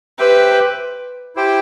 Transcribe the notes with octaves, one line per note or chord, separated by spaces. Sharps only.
G4 B4 C5 E5 G5
E4 G4 C5 G5